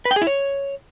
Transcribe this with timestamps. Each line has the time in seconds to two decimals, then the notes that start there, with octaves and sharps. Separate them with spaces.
0.05 B4
0.11 G5
0.16 G#4
0.22 E4
0.27 C#5